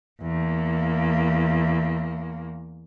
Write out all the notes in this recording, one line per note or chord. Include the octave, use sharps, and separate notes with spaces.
E2 A#3